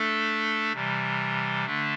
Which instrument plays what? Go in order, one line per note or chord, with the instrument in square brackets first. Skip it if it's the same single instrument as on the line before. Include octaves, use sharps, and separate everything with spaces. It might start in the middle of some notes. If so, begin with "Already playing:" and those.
Already playing: [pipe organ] A3 D4 A4
C3 E3 G3
D3 A3 D4